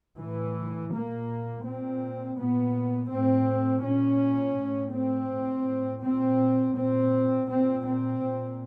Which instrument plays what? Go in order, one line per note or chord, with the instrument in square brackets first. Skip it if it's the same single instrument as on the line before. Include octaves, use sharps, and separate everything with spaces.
[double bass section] A2 E3
A#2 A#3
A#2 C4
A#2 B3
A2 C4
A#2 C#4
A2
C4
A2
A#2 C4
A#2 C4
A#2 C4
C4
A#2